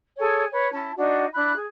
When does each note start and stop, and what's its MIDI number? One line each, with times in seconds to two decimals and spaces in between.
0.18 0.44 68
0.18 0.44 69
0.18 0.44 73
0.18 0.44 80
0.51 0.68 71
0.51 0.68 73
0.71 0.90 61
0.71 0.90 64
0.71 0.90 81
0.96 1.26 62
0.96 1.26 63
0.96 1.26 66
0.96 1.26 74
1.33 1.52 62
1.33 1.52 64
1.33 1.52 83
1.33 1.52 90
1.55 1.64 68